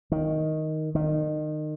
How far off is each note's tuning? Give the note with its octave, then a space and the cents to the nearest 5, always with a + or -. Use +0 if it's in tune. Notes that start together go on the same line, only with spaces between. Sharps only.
D#3 +5
D#3 -25